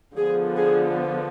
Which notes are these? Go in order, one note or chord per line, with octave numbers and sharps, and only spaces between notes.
D3 F3 B3 G#4
G#4